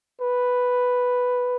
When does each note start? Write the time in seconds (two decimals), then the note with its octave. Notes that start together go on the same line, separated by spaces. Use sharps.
0.20 B4